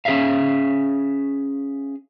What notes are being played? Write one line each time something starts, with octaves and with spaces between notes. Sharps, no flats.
C#4 G#4 C#5 E5 F5